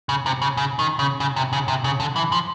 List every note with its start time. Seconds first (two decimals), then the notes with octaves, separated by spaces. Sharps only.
0.09 C#3
0.26 C3
0.42 C#3
0.57 C#3
0.79 D#3
0.99 C#3
1.20 C#3
1.36 C3
1.53 C#3
1.68 C3
1.84 C#3
2.00 D3
2.16 E3
2.32 F3